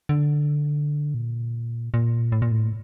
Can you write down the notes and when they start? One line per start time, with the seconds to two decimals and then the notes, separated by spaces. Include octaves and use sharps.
0.09 D3
1.14 A#2
1.94 A#2
2.32 A2
2.42 A#2
2.52 A2